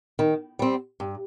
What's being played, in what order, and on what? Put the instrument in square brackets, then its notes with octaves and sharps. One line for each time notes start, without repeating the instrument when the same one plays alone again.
[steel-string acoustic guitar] D#3
G3 C4
G2